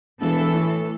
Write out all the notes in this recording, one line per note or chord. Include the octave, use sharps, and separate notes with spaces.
E1 E3 A4
A2